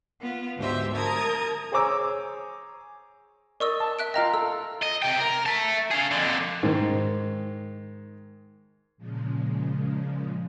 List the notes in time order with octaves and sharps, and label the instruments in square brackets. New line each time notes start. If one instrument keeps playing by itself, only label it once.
[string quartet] B3 F4
D2 G#2 G4 C5 E5
A#4 A5 D#6 G#6
[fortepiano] G#4 C5 C#5 A#5 D6 E6
[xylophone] A#4 C#6 E6 [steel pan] D5 D#5
[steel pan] A5
[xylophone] E5 F#6 D7
[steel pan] F4 F5 G5 [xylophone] D#5 A#5 F6
[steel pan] A4 [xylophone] E6
[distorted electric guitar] D#5
C3 G5
A#4
E5 A5
G#4 F5
F2 D3
[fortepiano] G#2 D#3
[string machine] A#2 C#3 F3 G#3